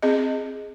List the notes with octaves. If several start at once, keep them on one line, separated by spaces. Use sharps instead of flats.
C4 G#4 D#5